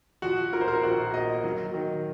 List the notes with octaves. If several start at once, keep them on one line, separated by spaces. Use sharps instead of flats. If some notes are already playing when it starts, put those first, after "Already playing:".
F3 F#4
A#2 A#4
C5
A#4
A#1 F#4
A#3 D#5
F#3
D#3